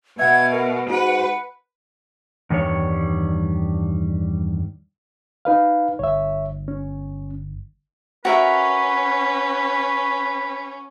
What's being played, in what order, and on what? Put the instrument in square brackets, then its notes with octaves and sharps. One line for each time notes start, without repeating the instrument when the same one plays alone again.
[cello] B2 [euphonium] B3 [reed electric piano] E5 F#5 [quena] G#6
[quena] A#4
[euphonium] G#2 [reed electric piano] F#4 [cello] B4 [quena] F#5
[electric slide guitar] E2 G2 D#3 G3 C#5
[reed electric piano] D#4 B4 F5
[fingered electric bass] G1 [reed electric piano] C#5 E5
[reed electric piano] C#4
[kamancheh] C#4 [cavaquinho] F#4 A#4 E5 [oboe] B4